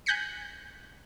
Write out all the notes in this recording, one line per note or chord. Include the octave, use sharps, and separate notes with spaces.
G#5 F#6 G6 A#6 B6 C#7